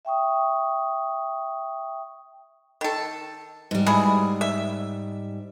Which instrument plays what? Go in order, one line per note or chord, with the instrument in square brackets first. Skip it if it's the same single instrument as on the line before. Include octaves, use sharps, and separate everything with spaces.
[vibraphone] E5 G5 C#6 D#6
[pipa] D#3 A4
[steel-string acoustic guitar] G#2 G3
[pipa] B2 E4 G#4
E5